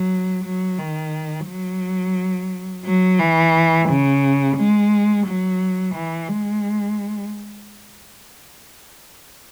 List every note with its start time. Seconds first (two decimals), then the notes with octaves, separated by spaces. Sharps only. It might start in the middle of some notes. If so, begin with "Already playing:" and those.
Already playing: F#3
0.44 F#3
0.79 D#3
1.47 F#3
2.85 F#3
3.19 E3
3.89 C#3
4.57 G#3
5.26 F#3
5.95 E3
6.29 G#3